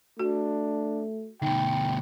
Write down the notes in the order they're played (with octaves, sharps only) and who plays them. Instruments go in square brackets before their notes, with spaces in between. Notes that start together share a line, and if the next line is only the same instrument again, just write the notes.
[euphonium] A3 [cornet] D4 [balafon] F#4
[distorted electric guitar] D2 B2 [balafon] D#4 [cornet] G5